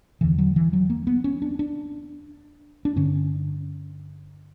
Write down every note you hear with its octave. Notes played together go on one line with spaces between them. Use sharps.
E2 D3 E3
F#3
E3
F#3
A#3
B3
C#4
D4
D4
D4
G2 D3 C#4